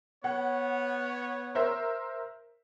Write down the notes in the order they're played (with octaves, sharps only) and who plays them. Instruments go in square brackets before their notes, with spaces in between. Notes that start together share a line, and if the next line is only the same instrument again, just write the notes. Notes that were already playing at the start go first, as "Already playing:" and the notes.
[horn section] B3 C#5 [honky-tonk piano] F#5
[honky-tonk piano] A#4 C5 E5